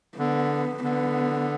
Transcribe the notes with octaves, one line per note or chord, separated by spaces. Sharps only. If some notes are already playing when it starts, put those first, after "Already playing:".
D3 B3
D3 B3